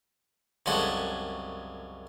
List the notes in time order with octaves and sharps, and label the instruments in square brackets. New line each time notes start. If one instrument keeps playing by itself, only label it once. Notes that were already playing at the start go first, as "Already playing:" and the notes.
[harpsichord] C2 F#2 C#3 G#3 F#4 A4